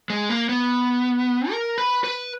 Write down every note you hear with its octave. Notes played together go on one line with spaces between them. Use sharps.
G#3
A#3
B3
A#4
B4
B4